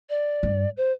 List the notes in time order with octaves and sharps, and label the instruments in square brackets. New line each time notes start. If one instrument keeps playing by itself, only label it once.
[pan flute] D5
[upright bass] G2
[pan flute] C5